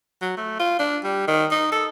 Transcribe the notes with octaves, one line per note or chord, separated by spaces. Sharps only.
F#3
A3
F4
D4
G3
D#3
D#4
A4